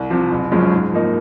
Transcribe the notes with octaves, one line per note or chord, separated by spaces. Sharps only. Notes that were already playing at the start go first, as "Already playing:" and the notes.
Already playing: C2
C3 F3
F#1
F#2 F3 G#3 C#4
G#2
F3 A#3 D#4